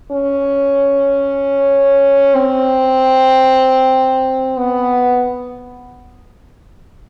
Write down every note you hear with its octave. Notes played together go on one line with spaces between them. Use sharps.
C#4
C4
B3